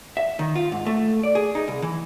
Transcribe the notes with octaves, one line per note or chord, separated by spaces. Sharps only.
E5
D#3
F4
G#2
A3
D5
G#4
D#4
C2
E3